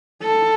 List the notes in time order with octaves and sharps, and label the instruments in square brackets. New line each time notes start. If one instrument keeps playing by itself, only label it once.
[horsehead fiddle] A4